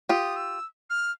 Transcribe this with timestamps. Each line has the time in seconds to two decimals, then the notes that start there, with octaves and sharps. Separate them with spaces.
0.09 F4 G4 D#6
0.36 E6
0.90 F6